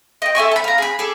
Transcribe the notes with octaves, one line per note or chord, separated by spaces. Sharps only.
D#5 G5
A4 E5 G#5 C#6
A5 B5
F5 A#5
G#4 B5
G#4 A4 D6